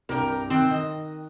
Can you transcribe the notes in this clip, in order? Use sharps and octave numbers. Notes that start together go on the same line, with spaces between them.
C2 G2 G4 A#4
D#3 C4 F#6
D#3 D#5